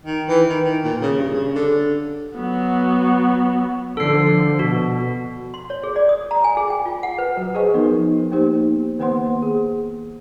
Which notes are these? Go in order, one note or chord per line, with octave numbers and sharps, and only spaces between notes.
D#3
E3
D#3
D#3
A#2
C#3
G2
C#3
D3
F#3 B3
D3 F3 A4 C7
B2 F#4
C6
C#5
G#4
D5
D#6
A#5
G#5
G#4
G5
F4
F#5
B4
F#3 F#4
G#4 B4 C5 D#5 G#5 C#6
F3 B3 D#4 A#4
A#3 B3 D#4 G4 C5
D#3 A#3 B3 C5 F#5 C6
G#4